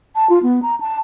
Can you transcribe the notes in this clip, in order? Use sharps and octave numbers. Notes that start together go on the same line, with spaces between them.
A5
F4
B3
A#5
A5